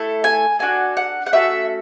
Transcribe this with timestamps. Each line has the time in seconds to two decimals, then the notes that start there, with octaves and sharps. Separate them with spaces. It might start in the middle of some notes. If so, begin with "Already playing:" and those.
Already playing: A3 E4 A4
0.24 G#5
0.59 D4 F#4 A4 G#5
0.97 F#5
1.26 F#5
1.33 A3 C#4 F#4 A4 E5